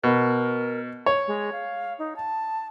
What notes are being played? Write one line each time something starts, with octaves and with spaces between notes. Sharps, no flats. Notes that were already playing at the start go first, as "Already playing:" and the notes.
B2 A#4
C#5
G#3
F5
D#4
A5